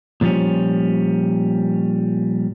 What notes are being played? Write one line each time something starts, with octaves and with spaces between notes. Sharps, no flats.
A#2 F3 G3 C#4